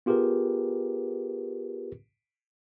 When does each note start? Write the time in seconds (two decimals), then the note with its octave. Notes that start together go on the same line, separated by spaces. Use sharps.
0.06 B3 F4 G4 G#4 A#4 B4